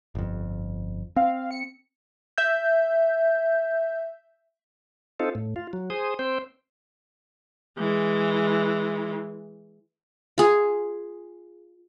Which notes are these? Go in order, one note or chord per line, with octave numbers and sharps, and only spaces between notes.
G1 F2
C4 F5
C#7
E5 G6
C4 D#4 F4 A4
A2
F4
F#3
G#4 C5 D#6
C4 C5 G5
E3 G#3
F4 G#4